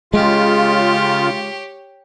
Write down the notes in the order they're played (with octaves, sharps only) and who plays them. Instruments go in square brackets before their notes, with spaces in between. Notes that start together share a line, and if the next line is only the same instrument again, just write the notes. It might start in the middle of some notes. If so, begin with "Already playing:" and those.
[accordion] C#3 F4 [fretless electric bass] G#3 [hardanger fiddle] G4 C#5